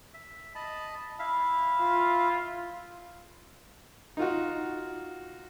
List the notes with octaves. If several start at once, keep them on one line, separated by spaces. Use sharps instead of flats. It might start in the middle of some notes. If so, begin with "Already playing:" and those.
E5
D#5 A5 B5
E4 E5 F5
F4
D#4 F4 F#4